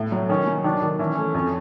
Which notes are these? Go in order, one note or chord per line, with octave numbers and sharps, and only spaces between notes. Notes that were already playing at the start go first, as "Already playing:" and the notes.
Already playing: A2
F#3
D#3 C#4
F#3
D#3 D4
D#3
E3 C#4
A3
F2